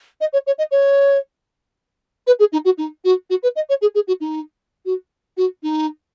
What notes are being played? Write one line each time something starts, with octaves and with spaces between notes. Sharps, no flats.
D#5
C#5
C#5
D#5
C#5
B4
G#4
D#4
F#4
D#4
F#4
F#4
B4
D#5
C#5
G#4
G#4
F#4
D#4
F#4
F#4
D#4